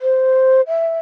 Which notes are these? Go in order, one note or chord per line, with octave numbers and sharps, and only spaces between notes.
C5
E5